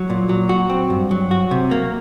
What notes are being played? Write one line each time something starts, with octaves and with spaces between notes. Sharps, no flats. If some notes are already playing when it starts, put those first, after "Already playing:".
Already playing: F#3
A#2
F#3
F#4
C4
G2
F#3
F#4
C3
A#3